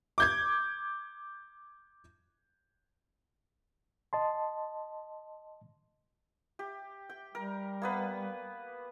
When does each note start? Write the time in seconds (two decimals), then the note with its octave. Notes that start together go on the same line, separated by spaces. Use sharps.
0.18 D6 G6 G#6
4.13 D#5 A5 C6
6.59 G4
7.09 G5
7.35 G3 A#4
7.82 A#3 B3 B4